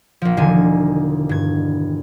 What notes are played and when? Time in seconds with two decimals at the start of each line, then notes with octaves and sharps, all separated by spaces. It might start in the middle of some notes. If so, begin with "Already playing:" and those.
0.22 A#1 F3
0.37 E1 D3 D#3 G#5
1.29 G2 G#6